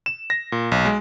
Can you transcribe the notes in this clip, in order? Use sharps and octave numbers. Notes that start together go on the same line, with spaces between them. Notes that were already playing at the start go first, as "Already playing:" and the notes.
E7
A#6
A#2
B1
G#3